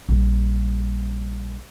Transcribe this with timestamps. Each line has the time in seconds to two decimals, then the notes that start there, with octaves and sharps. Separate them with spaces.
0.09 A#1 G3